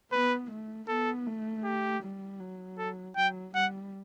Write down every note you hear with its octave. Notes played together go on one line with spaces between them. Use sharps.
B3 B4
A3
B3 A4
A3
G4
G3
F#3
A4
F#3 G5
G3 F#5